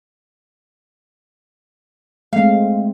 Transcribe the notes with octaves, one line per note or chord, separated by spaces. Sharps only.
G#3 A3 C4 F5